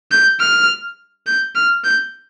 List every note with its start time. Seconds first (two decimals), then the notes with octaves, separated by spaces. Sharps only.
0.11 G6
0.40 F6
1.26 G6
1.55 F6
1.84 G6